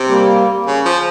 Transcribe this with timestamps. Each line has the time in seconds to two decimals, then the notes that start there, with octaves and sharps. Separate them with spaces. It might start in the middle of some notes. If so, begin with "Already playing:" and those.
Already playing: C3
0.08 G3 A#3
0.66 C#3
0.85 F3